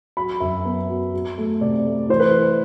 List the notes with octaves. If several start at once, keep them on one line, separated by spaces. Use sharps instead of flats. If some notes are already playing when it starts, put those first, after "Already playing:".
F#3 B5
F#2 E5
B3
F#3
F#3
A3
C3 D5
A3
E3 C5
B4